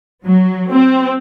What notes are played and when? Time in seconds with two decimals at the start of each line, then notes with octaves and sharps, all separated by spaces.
0.25 F#3
0.71 C4